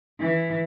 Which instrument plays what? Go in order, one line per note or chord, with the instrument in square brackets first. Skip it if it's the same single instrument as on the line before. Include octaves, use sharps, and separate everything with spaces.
[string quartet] E3